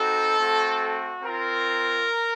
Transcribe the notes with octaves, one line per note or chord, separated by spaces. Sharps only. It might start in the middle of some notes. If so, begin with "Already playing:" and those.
Already playing: C4 D#4 F#4 A4
A3 C4 F#4
C4 F4 A#4